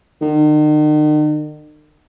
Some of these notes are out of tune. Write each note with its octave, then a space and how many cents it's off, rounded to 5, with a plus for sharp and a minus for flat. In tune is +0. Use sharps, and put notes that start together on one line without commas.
D#3 -45